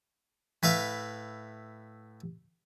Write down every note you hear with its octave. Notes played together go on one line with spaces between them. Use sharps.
A2 B4 E5 F5 B5